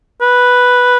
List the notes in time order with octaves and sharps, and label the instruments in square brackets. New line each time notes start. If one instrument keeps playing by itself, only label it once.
[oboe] B4